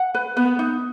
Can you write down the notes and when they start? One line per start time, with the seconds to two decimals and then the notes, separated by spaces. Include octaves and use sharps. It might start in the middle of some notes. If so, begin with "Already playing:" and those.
Already playing: F#5
0.15 B4
0.37 B3 B4
0.59 D#4